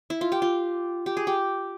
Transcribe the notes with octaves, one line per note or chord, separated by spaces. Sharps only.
E4
F4
G4
F4
G4
G#4
G4